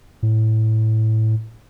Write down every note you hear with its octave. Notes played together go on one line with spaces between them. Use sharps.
A2